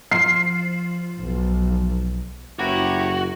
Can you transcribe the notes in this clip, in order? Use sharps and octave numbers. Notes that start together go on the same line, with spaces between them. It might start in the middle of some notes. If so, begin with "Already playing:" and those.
F3 C7
B1
F#1 E4 F#4 G4 B4 C#5 A#5 D6